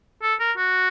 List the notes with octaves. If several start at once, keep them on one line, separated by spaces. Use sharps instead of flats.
A4
A#4
F#4